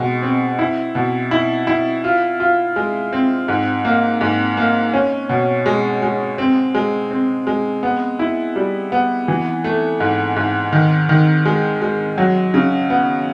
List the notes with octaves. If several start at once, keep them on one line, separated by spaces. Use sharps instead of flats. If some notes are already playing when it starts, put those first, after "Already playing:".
Already playing: B2 G#3
C4
E4
B2
E4
E4
F4
F4
G#3
C4
G#2
A#3
G#2
A#3
C#4
B2
G#3
G#3
C4
G#3
C4
G#3
B3
E4
G3
B3
E3
A3
G#2
G#2
D#3
D#3
G#3
G#3
F#3
C#3
B3